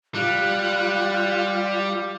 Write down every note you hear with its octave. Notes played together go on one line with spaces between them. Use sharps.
G3 F4 F#6